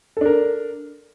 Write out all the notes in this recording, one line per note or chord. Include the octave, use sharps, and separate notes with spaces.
D4 A4 A#4